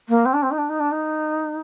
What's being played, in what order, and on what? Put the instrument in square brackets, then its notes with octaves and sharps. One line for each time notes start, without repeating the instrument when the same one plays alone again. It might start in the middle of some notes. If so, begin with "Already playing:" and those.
[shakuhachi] A#3
C4
D4
C4
D#4
D4
D#4
D4
D#4